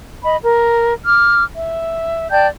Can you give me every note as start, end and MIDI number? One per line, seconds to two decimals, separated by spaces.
0.23 0.37 75
0.23 0.37 83
0.43 0.93 70
1.05 1.44 86
1.05 1.44 89
1.56 2.29 76
2.31 2.46 74
2.31 2.46 79
2.31 2.46 81
2.31 2.46 91